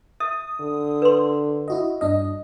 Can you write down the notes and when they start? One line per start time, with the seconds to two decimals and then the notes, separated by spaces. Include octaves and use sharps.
0.20 E5 D#6
0.60 D3
1.02 B4 C6
1.68 E4 F#4 D#5
2.01 G2 D4 D#5